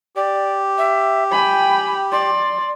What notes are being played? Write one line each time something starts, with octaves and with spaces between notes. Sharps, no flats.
G4 D5
E5
G5 G#5 B5
D5 C6